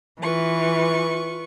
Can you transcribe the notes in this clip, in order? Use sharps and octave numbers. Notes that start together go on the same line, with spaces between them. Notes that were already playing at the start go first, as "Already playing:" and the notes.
E3 F4 B4 C#6